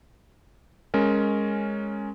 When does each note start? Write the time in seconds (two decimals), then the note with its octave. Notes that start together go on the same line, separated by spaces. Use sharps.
0.94 G#3 C#4 A#4